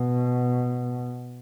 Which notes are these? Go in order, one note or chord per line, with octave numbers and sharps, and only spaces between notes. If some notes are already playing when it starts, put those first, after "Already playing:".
Already playing: B2